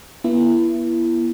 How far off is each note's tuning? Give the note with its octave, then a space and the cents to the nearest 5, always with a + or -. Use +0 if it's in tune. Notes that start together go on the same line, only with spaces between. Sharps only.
B3 -35 E4 +25